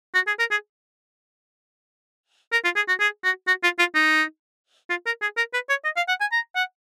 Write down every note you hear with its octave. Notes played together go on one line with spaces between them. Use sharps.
F#4
G#4
A#4
G#4
A#4
F4
G#4
F#4
G#4
F#4
F#4
F4
F4
D#4
F4
A#4
G#4
A#4
B4
C#5
D#5
F5
F#5
G#5
A#5
F#5